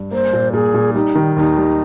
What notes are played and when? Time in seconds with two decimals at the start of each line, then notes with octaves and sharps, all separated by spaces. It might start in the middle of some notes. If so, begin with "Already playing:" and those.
Already playing: G2
0.11 A#3 C5
0.33 A#2
0.53 A#2 G#4
0.74 A#2
0.95 G3 D#4
1.15 D#3
1.37 D#2 D#4
1.57 G3